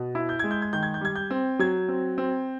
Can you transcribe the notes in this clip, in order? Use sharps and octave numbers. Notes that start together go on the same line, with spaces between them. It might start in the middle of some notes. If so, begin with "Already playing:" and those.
Already playing: B2
E4
G6
G#3 G#6
G6
G#6
D#3 G6
G#6
G6
G3 G#6
G6
C4
F#3 G#6
C4
C4